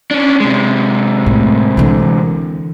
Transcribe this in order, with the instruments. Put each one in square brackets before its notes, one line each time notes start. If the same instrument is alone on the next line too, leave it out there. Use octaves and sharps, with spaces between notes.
[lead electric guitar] C#4 D4
C3 G#3
[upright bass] A2
D3 E3